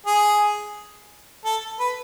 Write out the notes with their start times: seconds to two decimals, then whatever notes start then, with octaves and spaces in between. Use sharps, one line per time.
0.06 G#4
1.45 A4
1.80 B4